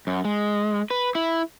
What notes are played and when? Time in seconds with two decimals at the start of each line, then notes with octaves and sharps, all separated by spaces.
0.07 F#2
0.25 G#3
0.90 B4
1.15 E4